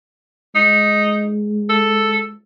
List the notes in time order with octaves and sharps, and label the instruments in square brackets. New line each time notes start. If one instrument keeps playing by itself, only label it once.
[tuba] G#3 [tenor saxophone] D#4
[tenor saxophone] A4